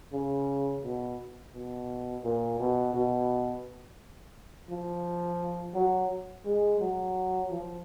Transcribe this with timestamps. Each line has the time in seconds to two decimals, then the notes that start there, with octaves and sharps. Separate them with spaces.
0.13 C#3
0.83 B2
1.54 B2
2.24 A#2
2.59 B2
2.94 B2
4.69 F3
5.74 F#3
6.45 G#3
6.80 F#3
7.50 F3